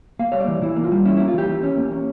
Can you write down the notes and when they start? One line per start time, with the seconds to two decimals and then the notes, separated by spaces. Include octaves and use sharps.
0.19 A#3 F5
0.32 G3 C#5
0.40 D5
0.48 E3
0.62 E3 E4
0.76 A#3
0.84 F4
0.92 G3
1.05 C#4 E4
1.17 A#3 E4
1.28 F4
1.34 E3 G4
1.49 E3
1.63 C#4
1.77 A#3
1.92 C#4